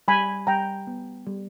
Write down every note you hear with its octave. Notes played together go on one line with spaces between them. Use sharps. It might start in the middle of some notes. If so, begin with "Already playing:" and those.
G3 G#5 B5
G3 G5 A#5
B3
G3